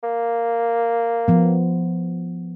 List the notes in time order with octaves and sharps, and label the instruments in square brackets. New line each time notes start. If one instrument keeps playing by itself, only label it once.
[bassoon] A#3
[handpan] F3 B3